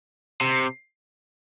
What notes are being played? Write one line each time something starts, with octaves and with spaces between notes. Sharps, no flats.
C3